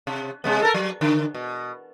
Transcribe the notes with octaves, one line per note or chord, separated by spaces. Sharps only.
C3
C3 G#3 B3
A4 A#4
F#3
D3
B2